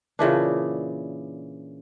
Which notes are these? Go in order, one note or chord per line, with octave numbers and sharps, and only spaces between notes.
A#2 C#3 E3 D4